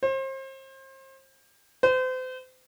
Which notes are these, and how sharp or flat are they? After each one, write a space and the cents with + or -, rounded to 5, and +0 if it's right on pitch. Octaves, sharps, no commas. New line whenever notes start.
C5 +35
C5 -35